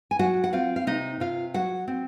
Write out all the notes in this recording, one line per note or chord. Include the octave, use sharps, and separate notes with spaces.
G#5
F#3 F#4 F#5
F#5
C4 F4 F5
F5
C3 D#4 D#5
C3 F4 F5
F#3 F#4 F#5
C4